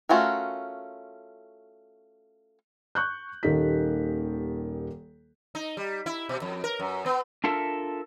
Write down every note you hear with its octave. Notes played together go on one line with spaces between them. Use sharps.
A3 C#4 F4 F#4 A#4
C#6 F#6 G6
D#1 D#3 A#3 G4 B6
D#4
G3
E4
B2
F2
A#4
F#2
B3
D4 F4 A4 A#4 E5